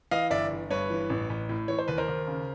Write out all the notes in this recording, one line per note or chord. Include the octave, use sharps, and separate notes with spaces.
E3 D#5 F5
G1 D5 E5
G1
G2 B4 C#5
E3
A1
A1
A2
E3 C#5
C5
D#2 B4
A#4 C5
D#2
C#3